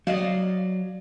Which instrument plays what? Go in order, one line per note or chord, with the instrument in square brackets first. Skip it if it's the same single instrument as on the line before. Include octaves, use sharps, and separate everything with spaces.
[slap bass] F#3 [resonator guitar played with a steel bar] D5 D#5 F5